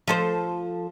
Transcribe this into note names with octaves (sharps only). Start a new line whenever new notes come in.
F3 A4 C5